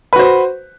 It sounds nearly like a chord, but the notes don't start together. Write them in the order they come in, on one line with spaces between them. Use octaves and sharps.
B4 F#4 C5